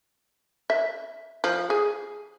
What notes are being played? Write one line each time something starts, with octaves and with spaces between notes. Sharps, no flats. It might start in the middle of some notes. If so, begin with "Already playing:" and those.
E5
F3
G#4